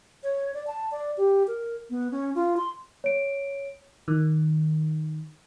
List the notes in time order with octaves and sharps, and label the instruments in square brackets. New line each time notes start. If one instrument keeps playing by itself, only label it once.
[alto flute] C#5
D5
A5
D5
G4
A#4
B3
C#4
F4
C6
[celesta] C#5 D7
[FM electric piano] D#3